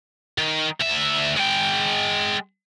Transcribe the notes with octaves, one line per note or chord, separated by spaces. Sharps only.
D#3
D2 E5
G#3 G5